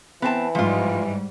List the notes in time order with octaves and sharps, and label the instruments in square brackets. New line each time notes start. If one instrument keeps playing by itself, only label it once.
[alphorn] E3 [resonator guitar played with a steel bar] B3 C4 A5
[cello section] G#2 G3 [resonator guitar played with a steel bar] F3 F4